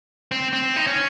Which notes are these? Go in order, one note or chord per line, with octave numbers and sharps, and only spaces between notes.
C4
C4
D#4
C#4